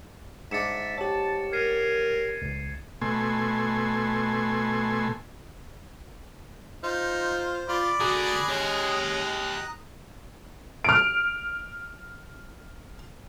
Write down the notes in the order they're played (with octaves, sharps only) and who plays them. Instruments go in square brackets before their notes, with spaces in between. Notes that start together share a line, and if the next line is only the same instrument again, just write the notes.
[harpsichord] G#2 D4 [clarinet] E5 [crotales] A6 C#7 E7
[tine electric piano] G4 C#5 [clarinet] A5
[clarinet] A#4 [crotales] G#6 C7 D#7
[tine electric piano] C#2
[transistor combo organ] B2 A3 G#5 C6
[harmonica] D#4 [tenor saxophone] F4 [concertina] C5
[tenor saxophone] F4 [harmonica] D5 B5 D6
[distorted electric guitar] D3 F#4 [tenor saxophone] G#4 [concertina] A#5 D#6 F#6
[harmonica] G#3 C#4 [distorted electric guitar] G4 D#5
[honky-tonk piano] F6 D7